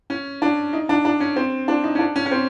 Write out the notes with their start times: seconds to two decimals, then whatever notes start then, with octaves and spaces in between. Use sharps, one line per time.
0.10 C#4
0.42 D4
0.73 D#4
0.89 D4
1.05 D4
1.20 C#4
1.36 C4
1.68 D4
1.84 D#4
1.95 C#4
1.99 D4
2.16 C#4
2.26 C#4
2.31 C4